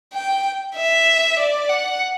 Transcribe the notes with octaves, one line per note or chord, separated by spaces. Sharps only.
G5
E5
D5
F#5